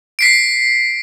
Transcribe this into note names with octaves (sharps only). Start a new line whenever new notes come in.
B6 C7 D7